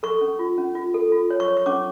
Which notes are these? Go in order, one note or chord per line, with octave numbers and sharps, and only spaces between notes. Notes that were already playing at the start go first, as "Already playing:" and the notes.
A4 C#6
C#4
F4
C#4
F4
A4
F4
C#5
C#6
C#5
C#6
C#4 D6